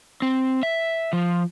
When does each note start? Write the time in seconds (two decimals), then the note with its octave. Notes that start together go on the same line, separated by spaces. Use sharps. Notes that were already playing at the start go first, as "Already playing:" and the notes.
0.22 C4
0.63 E5
1.13 F3